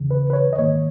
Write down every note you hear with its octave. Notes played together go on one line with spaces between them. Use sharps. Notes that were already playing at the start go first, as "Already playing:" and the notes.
Already playing: E2 C#3 E3
B4
B4
C#5
D#5
G#2 D#3 A#3 C#5